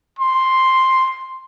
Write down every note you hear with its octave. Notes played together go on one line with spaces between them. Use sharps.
C6